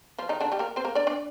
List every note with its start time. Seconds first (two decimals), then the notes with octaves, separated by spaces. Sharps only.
0.18 F3 F4
0.29 D#3 D#4
0.41 D3 D4
0.52 G3 G4
0.59 A#3 A#4
0.76 C4 C5
0.85 A#3 A#4
0.95 D4 D5
1.07 D4 D5